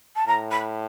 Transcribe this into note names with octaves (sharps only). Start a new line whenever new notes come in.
A5
A2 A#5
B5